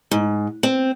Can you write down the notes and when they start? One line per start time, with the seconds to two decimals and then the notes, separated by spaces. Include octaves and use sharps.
0.11 G#2
0.63 C4